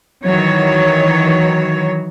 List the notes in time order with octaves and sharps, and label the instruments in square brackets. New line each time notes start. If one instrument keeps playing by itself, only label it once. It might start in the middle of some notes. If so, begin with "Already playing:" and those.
[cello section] D#3 E3 F#3 C#5